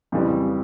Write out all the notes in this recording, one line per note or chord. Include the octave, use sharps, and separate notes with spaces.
F2 C#3 E3 G3